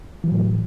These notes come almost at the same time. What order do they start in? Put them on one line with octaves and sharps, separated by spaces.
E3 F#3 A2